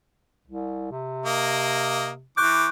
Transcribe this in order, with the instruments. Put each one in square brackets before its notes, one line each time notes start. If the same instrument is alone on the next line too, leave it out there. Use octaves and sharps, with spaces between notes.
[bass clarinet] C2
C3
[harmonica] A#3 D#5
[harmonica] E3 D6 [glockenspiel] C#6 F#6 G6